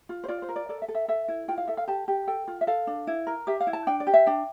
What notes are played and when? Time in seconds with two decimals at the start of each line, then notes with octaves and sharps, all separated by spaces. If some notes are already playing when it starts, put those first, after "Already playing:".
0.09 F4
0.24 C5
0.28 F4 D5
0.42 C5
0.49 A#4
0.56 D5
0.69 A4 D5
0.82 E5
0.88 A4
0.95 E5
1.08 A4 E5
1.28 E4
1.48 F4 G5
1.58 F5
1.68 A4 E5
1.77 F5
1.88 G4 A5
2.08 G4
2.27 A4 G5
2.48 F4
2.61 E5
2.67 A4 F5
2.87 D4
3.07 E4
3.27 A#4
3.47 G4 E5
3.60 F5
3.67 E4
3.73 A5
3.87 D4 G5
4.00 D5
4.07 G4
4.14 E5
4.26 D4 G5